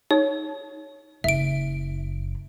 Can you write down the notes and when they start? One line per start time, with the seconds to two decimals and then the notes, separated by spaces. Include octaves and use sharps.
0.11 D#4 C#5
1.24 F#1 E5 D7